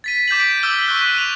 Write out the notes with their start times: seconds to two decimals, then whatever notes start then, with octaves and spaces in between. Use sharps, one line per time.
0.04 A6 B6 D#7
0.28 D6 G6 B6 F#7
0.40 D7
0.63 D6 E6 F6 G6 G7
0.87 C#6 E6 F#6 B6
1.17 D#7 F7